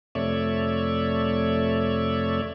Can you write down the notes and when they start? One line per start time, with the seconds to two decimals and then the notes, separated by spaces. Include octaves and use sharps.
0.15 F2 C3 A3 C#5 D5 E5